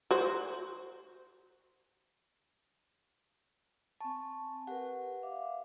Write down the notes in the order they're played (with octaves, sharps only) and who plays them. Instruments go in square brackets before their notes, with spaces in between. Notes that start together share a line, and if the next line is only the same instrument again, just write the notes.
[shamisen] F#4 C5
[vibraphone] C4 G#5 C#6 [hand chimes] A5
[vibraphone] G4 A#4 B4 [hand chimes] F#5
[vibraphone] E5 F5 D6